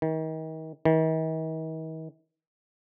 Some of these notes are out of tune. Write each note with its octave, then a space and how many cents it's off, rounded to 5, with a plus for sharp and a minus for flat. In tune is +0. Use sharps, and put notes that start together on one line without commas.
D#3 +35
D#3 +45